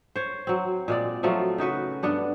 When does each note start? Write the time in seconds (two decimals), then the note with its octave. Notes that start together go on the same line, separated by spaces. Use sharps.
0.16 C5 C#5
0.47 F#3 C4
0.88 A#2 G#3 D5
1.23 F3 F#3 A3 F4
1.58 C#3 D#4 F#4 B4
2.03 G2 B3 D4 F#5